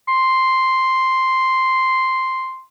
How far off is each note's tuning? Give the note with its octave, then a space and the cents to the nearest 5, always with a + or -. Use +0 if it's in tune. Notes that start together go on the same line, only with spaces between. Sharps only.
C6 +0